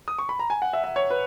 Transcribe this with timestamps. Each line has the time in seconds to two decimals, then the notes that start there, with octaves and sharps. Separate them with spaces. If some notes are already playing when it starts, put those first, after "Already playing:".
0.08 D#6
0.19 C#6
0.29 B5
0.39 A#5
0.50 G#5
0.62 F#5
0.73 E5
0.84 E5
0.96 C#5
1.10 B4